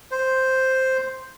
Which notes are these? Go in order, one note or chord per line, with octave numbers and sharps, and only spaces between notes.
C5